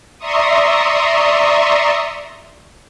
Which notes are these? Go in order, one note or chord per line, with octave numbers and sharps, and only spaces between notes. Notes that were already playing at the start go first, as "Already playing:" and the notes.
D5 E5 A#5 C6 C#6 D#6